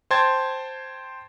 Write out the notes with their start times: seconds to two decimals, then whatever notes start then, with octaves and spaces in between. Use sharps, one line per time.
0.11 C5 G5 A5 C6 G#6 A6